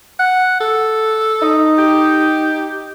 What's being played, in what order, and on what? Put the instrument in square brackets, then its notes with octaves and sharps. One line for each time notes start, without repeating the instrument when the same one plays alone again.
[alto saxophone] F#5
A4
[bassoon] D#4
[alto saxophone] G4